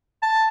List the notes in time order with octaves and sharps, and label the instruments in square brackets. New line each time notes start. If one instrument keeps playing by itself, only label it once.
[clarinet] A5